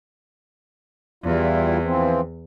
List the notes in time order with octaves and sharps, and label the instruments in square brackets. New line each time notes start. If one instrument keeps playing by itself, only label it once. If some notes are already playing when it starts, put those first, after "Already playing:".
[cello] E2 [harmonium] G3 E4 F4
[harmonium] E3 F3 C4